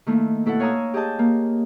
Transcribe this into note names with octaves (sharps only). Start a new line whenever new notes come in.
D#3 A3 A#3 E4
B2 E4 A4 F#5
C#5 F5 G#5 A#5 D#6 E6
G4 G#4 D#5 A5 G6
A#3